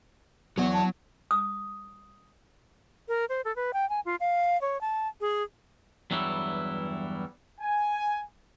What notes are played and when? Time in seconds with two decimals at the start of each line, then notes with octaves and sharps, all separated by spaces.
0.58 E2 F#3 F#4
0.73 A5
1.31 D#6
3.08 A#4
3.29 C5
3.45 A4
3.56 B4
3.73 G5
3.89 G#5
4.05 F4
4.20 F5
4.61 C#5
4.81 A5
5.21 G#4
6.11 E2 G2 E3 F#3 G3 E4
7.61 G#5